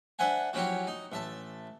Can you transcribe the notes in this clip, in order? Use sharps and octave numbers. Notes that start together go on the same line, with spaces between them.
D4 C5 E5 F#5 G#5
F3 F#3 C#4 E4 F#4 G4
D#4
A1 E5 A5